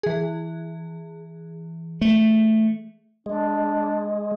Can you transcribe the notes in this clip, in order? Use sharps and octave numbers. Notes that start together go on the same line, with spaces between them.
E3 G#4
A3
G#3 D4